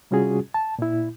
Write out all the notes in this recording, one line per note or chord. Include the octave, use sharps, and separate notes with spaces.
C3 G3 C#4 F4 F#4 G#4
A5
A#2 E4